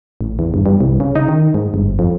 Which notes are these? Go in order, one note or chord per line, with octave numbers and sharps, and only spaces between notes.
A1
E2
G1
G2
C2
C#3
D#4
D#3
G#2
G1
F2